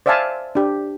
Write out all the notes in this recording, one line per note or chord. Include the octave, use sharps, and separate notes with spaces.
C5 D5 E5 F5 G#5 A5
D4 G4